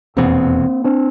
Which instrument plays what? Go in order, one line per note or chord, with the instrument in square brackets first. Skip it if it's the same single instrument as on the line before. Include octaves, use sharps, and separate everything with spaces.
[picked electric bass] F1 E2 B2 [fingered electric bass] A#3 C4
[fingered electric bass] C4 D4